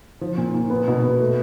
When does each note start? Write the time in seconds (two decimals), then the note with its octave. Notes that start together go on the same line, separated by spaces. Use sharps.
0.21 F3
0.37 A#2
0.54 A#2
0.70 B3
0.88 B2
1.03 B3
1.20 A3